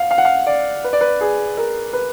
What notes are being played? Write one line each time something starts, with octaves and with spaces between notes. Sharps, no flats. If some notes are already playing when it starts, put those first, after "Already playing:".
Already playing: F5 F#5
F5
F#5
F5
D5
B4
D5
B4
G#4
A#4
B4